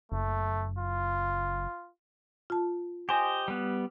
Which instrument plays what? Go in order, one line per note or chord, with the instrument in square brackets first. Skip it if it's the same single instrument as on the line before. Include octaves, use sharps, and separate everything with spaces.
[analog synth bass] F#1 [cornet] A3
[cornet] F4
[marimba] F4 A5
[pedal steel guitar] G4 C5 D#5 [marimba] G#5
[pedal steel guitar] G3 B3